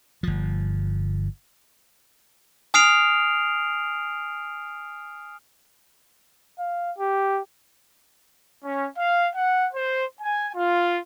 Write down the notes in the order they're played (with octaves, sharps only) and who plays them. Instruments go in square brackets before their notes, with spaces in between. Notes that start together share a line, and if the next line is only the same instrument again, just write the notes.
[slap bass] G1 F3
[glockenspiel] G#5 D#6 F6 C7 D7 F7
[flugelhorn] F5
G4
[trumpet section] C#4
F5
F#5
C5
G#5
F4